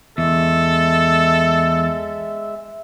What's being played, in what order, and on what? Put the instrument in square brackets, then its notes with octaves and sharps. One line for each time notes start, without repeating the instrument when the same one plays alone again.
[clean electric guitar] E2 [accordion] G#3 E5 [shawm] A4